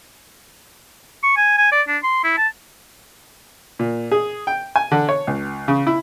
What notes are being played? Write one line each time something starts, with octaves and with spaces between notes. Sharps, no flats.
C#6
G#5
G#5
D5
D4
C6
E4
A5
A#2
G#4
G5
G#5
D3
C#5
C#2
C#3
E4